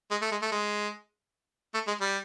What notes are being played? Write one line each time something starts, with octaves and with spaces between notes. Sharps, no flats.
G#3
A3
G#3
A3
G#3
A3
G#3
G3